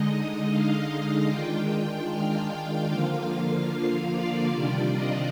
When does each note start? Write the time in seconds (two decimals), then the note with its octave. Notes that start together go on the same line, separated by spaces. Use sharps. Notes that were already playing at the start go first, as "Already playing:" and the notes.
Already playing: D3 G#3 D#4 D#5
0.48 F5
1.29 D#3 G#3 D4 F4 G5
2.10 F5
2.90 D3 F3 A#3 F4
3.71 F5
4.12 D5
4.51 C3 D#3 G3 D4 F4 D5
4.92 D#5